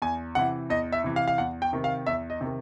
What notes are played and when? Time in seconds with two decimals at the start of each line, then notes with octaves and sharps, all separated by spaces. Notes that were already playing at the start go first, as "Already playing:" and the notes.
0.02 E2 G#5
0.35 C3 E3 F#5
0.70 E2 D#5
0.93 E5
1.04 C3 E3
1.16 F5
1.28 F5
1.38 E2 F#5
1.62 G5
1.73 C3 D#3
1.84 F5
2.07 E2 E5
2.30 D#5
2.41 C3 D#3